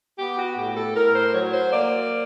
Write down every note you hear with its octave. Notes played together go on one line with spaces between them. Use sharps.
B3 G4
F#4
A2 G4
A4
A2 A#4
C5
F#3 C#5
C5
A#3 D5